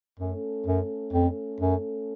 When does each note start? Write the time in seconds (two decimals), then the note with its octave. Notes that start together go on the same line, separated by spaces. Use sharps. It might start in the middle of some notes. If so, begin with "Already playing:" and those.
0.19 F#2 A3 C#4 A4
0.66 F#2
1.13 F2
1.60 F#2